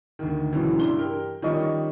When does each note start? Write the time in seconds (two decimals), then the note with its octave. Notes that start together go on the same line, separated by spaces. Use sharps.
0.19 D2 D#3
0.53 C#2 F#2 B2 E3
0.77 G2 D4 E4 C6 G7
0.97 G4 A#4
1.42 D#3 F3 G3 C#4 D#5 C#6